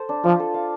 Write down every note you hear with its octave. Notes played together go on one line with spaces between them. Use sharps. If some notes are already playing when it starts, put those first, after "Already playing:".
Already playing: A4 C5
D4
F3 F4
A4
F5